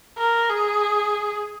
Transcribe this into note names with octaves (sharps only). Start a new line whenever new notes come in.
A#4
G#4